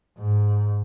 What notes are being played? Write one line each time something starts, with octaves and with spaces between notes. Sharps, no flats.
G#2